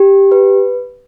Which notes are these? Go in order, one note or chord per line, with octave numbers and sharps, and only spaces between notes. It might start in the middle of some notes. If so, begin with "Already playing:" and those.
Already playing: G4
B4